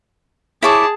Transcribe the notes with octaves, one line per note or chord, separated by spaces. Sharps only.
E4 G#4 C#5 A5 D6